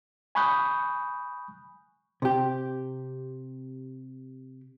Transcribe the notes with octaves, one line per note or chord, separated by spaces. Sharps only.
G#5 B5 C#6 D#6 F#6 G6
C3 G4